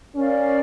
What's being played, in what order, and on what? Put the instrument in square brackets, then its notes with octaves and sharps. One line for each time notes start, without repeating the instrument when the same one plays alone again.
[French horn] C#4 [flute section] A#4 D5 F5